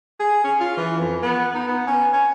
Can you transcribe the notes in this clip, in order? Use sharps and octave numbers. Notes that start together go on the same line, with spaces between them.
G#4
C#4
F4
E3
F2
B3
D#4
B3
C#4
C#4